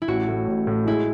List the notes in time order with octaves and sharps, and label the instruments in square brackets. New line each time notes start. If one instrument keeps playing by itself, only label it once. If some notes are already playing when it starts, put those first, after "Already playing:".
[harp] E4
[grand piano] A1 [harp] F#4
[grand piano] A2
A1
A2
[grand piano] G#3 [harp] E4